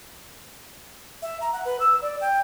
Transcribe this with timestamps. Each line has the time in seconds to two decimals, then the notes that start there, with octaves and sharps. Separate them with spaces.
1.22 E5
1.41 A#5
1.53 F#5
1.65 B4
1.80 E6
2.02 D5
2.21 G5